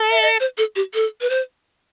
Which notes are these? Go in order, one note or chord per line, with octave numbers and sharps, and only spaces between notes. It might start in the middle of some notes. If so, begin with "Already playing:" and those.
Already playing: A4
E5
D#5
C5
A4
G4
A4
B4
C5